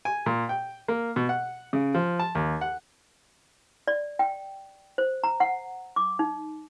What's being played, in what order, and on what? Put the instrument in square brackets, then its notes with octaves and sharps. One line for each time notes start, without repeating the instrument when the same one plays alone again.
[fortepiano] G#5
A#2
G5
A#3
B2
F#5
C#3
F3
A5
D#2
F#5
[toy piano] D5
G5
C5
A#5
F#5
D6
D#4